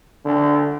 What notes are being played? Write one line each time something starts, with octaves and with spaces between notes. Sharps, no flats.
D3